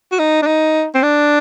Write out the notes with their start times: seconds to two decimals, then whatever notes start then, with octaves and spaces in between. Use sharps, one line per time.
0.12 F#4
0.19 D#4
0.42 D4
0.47 D#4
0.94 C4
1.03 D4